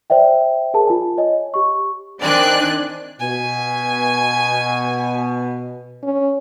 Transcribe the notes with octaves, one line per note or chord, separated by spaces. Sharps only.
C5 D5 E5 G5
G#4 A#4 A5
F4 G#5
C#5 D#5 G#5
G4 C#6
D#3 C4 D4 D5 G#5 F#6
B2 G#5
C#4